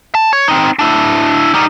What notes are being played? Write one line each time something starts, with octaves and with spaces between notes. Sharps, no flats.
A5
C#5
C4 D#4
D4 E4
G3 D#4